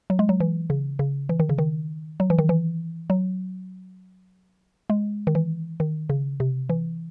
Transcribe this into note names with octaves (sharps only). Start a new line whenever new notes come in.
F#3
G#3
F#3
E3
C#3
C#3
E3
D#3
C#3
D#3
F#3
E3
D#3
E3
F#3
G#3
D#3
E3
D#3
C#3
C3
E3